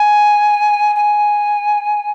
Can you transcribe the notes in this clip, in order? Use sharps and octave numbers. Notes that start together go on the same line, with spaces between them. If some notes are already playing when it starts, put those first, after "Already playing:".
Already playing: G#5
G#5